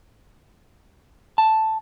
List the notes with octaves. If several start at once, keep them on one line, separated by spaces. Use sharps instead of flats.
A5